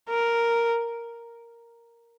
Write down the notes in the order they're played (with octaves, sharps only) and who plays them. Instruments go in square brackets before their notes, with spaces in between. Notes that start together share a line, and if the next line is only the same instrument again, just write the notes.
[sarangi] A#4